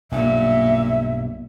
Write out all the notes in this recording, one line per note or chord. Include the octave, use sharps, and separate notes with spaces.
B1 G2 A#2 E5